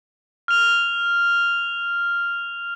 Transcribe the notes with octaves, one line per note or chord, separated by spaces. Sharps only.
F6 F7